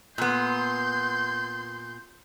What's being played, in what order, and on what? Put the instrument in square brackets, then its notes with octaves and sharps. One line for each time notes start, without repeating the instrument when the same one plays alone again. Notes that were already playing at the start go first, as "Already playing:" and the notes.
[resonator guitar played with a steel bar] A#2 B3 [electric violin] C6 G6